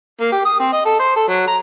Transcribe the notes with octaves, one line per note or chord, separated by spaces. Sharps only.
A#3
G4
D#6
C4
D#5
A4
C5
A4
F#3
A#5